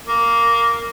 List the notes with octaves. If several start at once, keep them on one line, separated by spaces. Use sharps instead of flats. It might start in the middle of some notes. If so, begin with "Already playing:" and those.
A#3